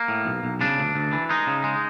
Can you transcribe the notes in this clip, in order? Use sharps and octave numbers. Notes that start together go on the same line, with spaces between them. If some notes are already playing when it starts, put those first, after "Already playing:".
Already playing: A#3
A2
B1
B1
C#3 D4
D2
D2
E3
G#3 D#4
C#3
G#3